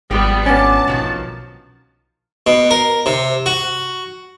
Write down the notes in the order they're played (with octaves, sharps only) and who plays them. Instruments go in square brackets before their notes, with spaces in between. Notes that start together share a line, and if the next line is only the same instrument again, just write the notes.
[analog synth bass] G#1 [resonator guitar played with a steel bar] F3 G4 [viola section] G3 B3
[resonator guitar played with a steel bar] A#2 D4 D5 [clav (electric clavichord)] B3 C#4 [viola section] A5
[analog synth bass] B1 [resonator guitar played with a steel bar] D#3 F3 F#3
[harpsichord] B2
A#4
C3
F#4